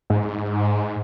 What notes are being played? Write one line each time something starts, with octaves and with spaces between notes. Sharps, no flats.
G#2